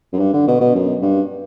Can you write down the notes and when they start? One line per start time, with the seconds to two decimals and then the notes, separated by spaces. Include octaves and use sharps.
0.13 F#2
0.19 G2
0.33 D3
0.48 B2
0.61 B2
0.75 F#2
1.02 G2